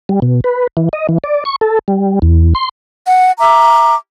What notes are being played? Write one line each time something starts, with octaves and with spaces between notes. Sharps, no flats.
G3
B2
B4
E3
D#5
E3
D5
C#6
A4
G3
E2
C6
F#5
E5 A#5 D6